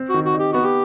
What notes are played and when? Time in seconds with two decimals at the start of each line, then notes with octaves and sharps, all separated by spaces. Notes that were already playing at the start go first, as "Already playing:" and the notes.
Already playing: C4
0.09 F#4
0.14 D#3
0.25 F#4
0.34 D#4 G4
0.52 B3 F#4
0.63 G4